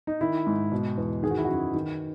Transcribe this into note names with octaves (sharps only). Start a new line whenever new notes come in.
D#4
D#3 E4
G#2
B2
E2
D#3 G#4
F#4
E4
F#2 F#4
D#3